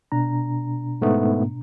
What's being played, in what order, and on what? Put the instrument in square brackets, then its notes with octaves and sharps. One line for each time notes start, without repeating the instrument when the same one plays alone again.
[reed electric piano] B2 D4 A#5
[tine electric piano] G#2 A3 B3